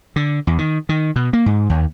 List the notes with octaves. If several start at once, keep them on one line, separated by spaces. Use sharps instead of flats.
D3
E2
D#3
D#3
B2
A#3
G#2
D#2